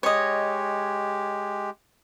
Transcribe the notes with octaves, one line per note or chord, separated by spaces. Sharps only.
G#3 G4 C#5 D#5